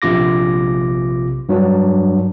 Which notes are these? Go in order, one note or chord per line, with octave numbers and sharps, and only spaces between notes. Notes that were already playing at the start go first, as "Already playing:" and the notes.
A#1 C3 F4 D6 A#6
G2 F#3 D4